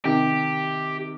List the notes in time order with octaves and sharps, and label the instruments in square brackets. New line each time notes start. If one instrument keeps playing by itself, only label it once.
[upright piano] C3 D#3 [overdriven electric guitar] G4